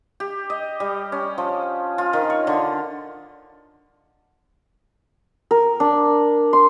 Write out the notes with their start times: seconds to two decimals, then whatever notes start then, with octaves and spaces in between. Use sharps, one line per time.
0.20 G4
0.50 D#5
0.80 G3
1.12 C#4
1.38 F3
1.98 F4
2.13 D#3
2.30 C#5
2.47 D3
5.51 A#4
5.80 D4
6.53 C6